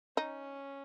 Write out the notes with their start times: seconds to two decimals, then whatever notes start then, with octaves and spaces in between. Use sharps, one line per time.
0.17 C#4 D#4